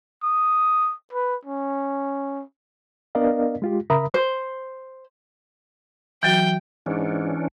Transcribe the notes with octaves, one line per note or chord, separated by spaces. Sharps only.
D#6
B4
C#4
B3 D4 A#4 D5 D#5 F5
G#3 F4 G4
C#3 A#4 E5 A#5 B5 D#6
C5
E3 F#3 F#4 G5
G#2 E3 C#4 D4